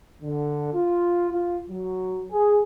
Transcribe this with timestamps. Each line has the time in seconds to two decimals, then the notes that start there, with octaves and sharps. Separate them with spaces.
0.22 D3
0.73 F4
1.31 F4
1.70 F#3
2.31 G#4